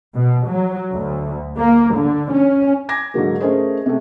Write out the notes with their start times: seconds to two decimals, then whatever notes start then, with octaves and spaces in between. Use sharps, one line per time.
0.15 B2
0.47 F#3
0.93 D2
1.59 A#3
1.96 D3
2.33 C#4
2.89 G#5 D6 G#6 A#6
3.14 G#2 D3 F#3 A#3
3.40 A3 C#4 G#4 A#4 C5 D#5
3.86 C3 A3